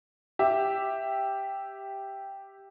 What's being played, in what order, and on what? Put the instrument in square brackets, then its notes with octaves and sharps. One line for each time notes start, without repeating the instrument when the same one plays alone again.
[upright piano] G4 E5